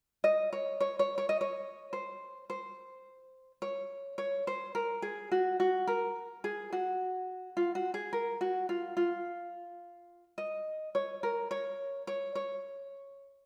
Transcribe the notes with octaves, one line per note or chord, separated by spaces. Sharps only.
D#5
C#5
C#5
C#5
C#5
D#5
C#5
C5
C5
C#5
C#5
C5
A#4
G#4
F#4
F#4
A#4
G#4
F#4
F4
F#4
G#4
A#4
F#4
F4
F4
D#5
C#5
A#4
C#5
C#5
C#5